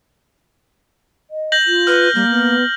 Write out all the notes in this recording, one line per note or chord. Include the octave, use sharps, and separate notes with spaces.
D#5
G6 A#6 F#7
F4
B4 F6
G3 A#3
B3